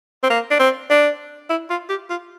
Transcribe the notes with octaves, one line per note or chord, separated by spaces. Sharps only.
C4
A#3
D4
C4
D4
E4
F4
G4
F4